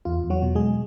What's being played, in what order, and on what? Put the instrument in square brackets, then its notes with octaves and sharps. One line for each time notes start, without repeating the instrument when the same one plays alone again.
[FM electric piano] E2 F4
E2
F#3 F#4
B2
G#3 G#4